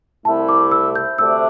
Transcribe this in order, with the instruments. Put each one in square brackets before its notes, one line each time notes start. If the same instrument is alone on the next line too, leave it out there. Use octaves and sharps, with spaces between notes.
[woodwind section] C2 C3 A3 E4 [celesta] A5
[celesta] D6
E6
G6
[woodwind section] D2 C3 A3 D4 [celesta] E6